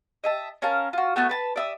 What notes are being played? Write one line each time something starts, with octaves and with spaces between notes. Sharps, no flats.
D#5 E5 A5
C#4 A#4 F5 A5
F4 F#4
A3 B3 F#4 A5
B4 A5 B5
D5 E5 D#6